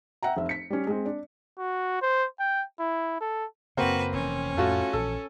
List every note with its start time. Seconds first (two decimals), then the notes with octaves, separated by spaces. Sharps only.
0.23 E5 F#5 G5 A#5
0.37 F1 E5
0.49 B6 C#7
0.70 G3 C#4
0.87 G#3 C4
1.06 D4
1.59 F#4
2.02 C5
2.40 G5
2.80 E4
3.21 A4
3.77 F#2 C#3 A#3 C4 F#4 B4
4.13 F1 E3 C#4
4.57 F2 A2 A3 C4 F4 F#4
4.93 A#1 E3 A4